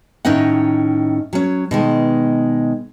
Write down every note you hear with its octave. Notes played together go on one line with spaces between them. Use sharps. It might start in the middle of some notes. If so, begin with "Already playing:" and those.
A2 D#3 C#4 D#4 D#5 F#5
F#3 C#4
B2 D#3 G#3